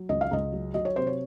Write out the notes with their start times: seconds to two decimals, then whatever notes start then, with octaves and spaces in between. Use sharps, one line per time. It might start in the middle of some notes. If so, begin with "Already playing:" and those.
Already playing: F#3
0.09 C#2 D#5
0.21 F5
0.31 C#2 D#5
0.53 F#3
0.74 F#3 D#5
0.85 C#5
0.96 C3 C5
1.07 C#5